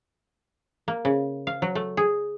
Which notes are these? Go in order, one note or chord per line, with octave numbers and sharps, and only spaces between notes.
A#3
C#3
F5
F#3
A3
G#4